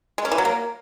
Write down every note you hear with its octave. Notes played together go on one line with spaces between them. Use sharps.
G#3
C#4
E3
F#3
A#3